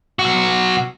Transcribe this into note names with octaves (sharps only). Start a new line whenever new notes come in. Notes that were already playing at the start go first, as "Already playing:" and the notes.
B1 F#4